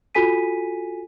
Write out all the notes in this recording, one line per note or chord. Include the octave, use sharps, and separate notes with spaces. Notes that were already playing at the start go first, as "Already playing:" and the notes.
F4 F#4 A4 G#5 B6 D#7